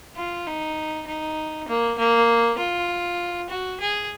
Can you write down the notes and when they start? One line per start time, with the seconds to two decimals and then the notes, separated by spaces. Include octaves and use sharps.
0.16 F4
0.47 D#4
1.07 D#4
1.68 A#3
1.98 A#3
2.58 F4
3.50 F#4
3.81 G#4